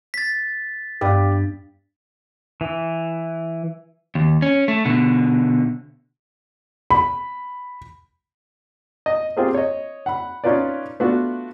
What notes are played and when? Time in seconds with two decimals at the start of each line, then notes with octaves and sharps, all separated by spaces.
0.14 A6 B6
1.01 G2 B3 G4 D5 F5
2.61 E3
4.15 D#2
4.42 C#4
4.68 A3
4.85 B2 D3
6.90 B5
9.06 D#5
9.37 C4 F4 G4 G#4 A#4 C5
9.54 C#5 D#5
10.06 F#5 B5
10.44 C#4 D#4 F4 B4 D5
11.00 A3 B3 D4 F4 F#4